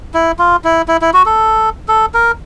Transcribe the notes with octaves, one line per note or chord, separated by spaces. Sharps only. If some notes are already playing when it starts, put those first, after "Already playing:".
E4
F4
E4
E4
E4
F#4
A4
A4
A#4